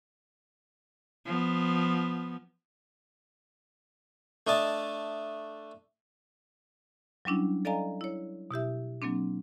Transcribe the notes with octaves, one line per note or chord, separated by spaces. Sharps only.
F3 B3
A3 D4 D#5 A5
F#3 G3 C#4 D4 E4
A4 D5 D#5 F5 G#5 A#5
E4 C#5
B2 E4 G4 E5
F#3 A#3 C4 D4